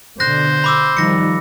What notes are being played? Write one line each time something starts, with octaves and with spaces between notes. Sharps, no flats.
B2 D3 C5 F#6 A#6
B5 D6 E6
D#3 F3 G3 A#6 C#7